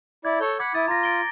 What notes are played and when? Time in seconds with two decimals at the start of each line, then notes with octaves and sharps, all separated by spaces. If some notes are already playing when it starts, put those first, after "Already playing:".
0.25 E4 D5 G#6
0.40 A4 C#5 G6
0.59 F#5 B5 D6 G#6
0.74 E4 D#6 A6
0.88 F4 A#5 A#6
1.03 A6 D7 G7